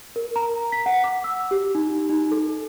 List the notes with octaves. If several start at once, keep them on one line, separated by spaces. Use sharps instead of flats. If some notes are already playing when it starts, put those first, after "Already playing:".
A#4
A#5
B6
F#5
D6
E6
G4
D#4
D#4
A4